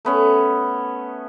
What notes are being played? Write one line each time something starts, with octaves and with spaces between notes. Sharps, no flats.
A3 B3 C#4